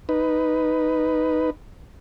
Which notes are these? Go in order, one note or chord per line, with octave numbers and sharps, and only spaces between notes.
D#4 B4